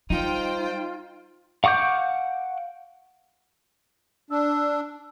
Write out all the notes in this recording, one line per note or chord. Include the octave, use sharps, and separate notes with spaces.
G3 D#4 F4 C5 G5
F5 F#5 C#6 D6 G6
D4 E6